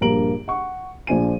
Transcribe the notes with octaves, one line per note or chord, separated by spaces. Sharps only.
A#1 G2 A#3 A#5 D7 F#7
F#5 C#6
A#1 F3 D4 C5 G#5 D#7